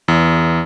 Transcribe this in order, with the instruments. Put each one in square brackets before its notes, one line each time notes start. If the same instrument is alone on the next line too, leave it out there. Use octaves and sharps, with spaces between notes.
[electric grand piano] E2